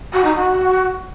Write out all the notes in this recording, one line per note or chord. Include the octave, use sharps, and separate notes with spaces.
F#4
D#4
F#4